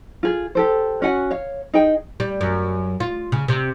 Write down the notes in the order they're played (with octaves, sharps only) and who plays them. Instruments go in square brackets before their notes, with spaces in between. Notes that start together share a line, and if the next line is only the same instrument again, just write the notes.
[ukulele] F4 G#4
G4 A4 C5
C#4 F#4 F#5 G#5
C#5 F5
D#4 G#4 G5
[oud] G3
F#2
F4
C#3
C3